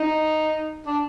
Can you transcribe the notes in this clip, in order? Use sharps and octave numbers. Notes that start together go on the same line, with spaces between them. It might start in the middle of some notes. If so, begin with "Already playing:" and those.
Already playing: D#4
D4